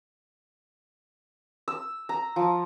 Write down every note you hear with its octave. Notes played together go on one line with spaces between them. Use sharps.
E6
A#5
F3